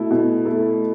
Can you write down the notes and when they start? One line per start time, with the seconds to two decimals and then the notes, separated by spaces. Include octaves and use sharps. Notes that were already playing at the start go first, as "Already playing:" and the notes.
Already playing: B2 A3 E4 A4
0.11 B2
0.45 A3 E4 A4